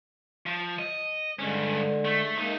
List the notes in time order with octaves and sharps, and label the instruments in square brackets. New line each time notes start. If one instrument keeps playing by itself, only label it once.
[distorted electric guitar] F3
D#5
[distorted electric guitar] G2 C#4 [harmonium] D3 G#3
[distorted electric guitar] A3
[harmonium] G#3 A#3 [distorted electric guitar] D#4 E5